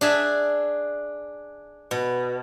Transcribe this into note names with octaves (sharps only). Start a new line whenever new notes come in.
D4 G#4 E5
B2